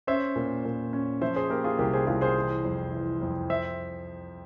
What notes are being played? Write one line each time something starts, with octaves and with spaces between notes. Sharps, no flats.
C#4 C5 E5
A#2
A#2
C#4
F3 C5 E5
G#4 C5
A#3 G4 A#4
F4 G#4
C2 G4 A#4
G#4 C5
C2 F4 G#4
G#4 C5
E3
F2
E3
F2
C5 E5